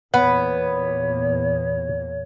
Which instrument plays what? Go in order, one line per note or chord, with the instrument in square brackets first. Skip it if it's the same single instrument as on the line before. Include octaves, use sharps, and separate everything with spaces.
[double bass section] E2 A#2 [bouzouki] B3 [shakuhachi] C#5 [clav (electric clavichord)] F#5